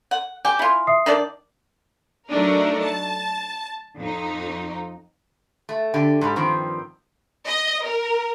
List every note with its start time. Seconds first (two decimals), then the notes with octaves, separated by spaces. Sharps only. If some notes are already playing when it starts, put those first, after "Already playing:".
0.11 F#5
0.45 G4 G#5
0.59 E4 F4
0.87 E5 D#6 C7
1.06 D#3 D4 D5
2.27 F#3 A3 D4 D#4 A#4
2.81 A5
3.98 F2 D#4
5.69 A3
5.94 D3 G4
6.21 G#2 G3
6.36 G2 D#3 F3 C4
7.46 D#5
7.86 A#4